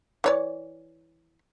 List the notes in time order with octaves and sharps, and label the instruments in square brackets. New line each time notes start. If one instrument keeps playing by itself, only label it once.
[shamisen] E3 C#5 D5